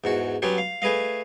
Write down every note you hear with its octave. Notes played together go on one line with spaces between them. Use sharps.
E2 G#2 F#4
F#3 B3 C#4 D4 G4
F5
A3 G#4 B4 D#5 F5